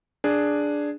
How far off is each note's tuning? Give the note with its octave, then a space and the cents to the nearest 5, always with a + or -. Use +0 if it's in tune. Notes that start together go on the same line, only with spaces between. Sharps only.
D4 +0 G#4 +0